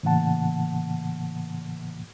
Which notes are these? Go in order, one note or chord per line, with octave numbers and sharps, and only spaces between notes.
A2 C#3 E3 A#3 F#5 A5